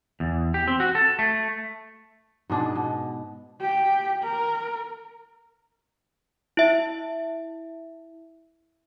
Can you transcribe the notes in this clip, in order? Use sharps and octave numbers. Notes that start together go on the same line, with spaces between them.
E2
G4
C4
F#4
A4
A3
G#2 B2 D4 G#4
B2
G4
A#4
E4 E5